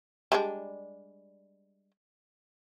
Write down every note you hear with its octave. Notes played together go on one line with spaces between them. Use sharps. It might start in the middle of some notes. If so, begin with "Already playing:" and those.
G3 G#3 D4